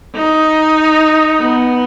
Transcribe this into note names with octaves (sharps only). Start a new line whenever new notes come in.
D#4
B3